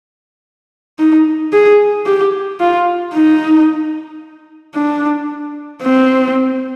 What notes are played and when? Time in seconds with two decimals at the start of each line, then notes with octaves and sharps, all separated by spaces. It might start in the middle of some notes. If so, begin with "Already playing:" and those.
0.99 D#4
1.53 G#4
2.06 G4
2.60 F4
3.14 D#4
4.75 D4
5.83 C4